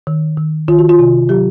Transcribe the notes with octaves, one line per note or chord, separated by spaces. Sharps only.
D#3
D#3
D#3 F4
F#4
F4
C3
F#3 G4